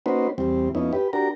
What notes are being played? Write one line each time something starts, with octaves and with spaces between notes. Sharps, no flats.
A#3 C#4 D#4 F#4 B4 C5
E2 G3 C4
F2 B3 C#4 D#4 E4
G4 B4
D4 F#4 G4 A#4 A#5